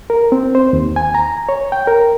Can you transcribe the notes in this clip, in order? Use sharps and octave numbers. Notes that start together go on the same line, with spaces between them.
A#4
C4
C5
D#2
G#5
A#5
C#5
G5
A#4